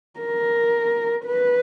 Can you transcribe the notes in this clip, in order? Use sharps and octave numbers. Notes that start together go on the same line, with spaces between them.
A#4
B4